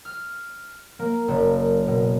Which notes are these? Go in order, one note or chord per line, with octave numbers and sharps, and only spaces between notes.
F6
A#3
F#1
B2